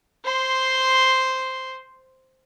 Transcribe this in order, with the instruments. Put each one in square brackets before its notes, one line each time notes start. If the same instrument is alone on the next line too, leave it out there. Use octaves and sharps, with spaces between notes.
[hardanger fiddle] C5 C6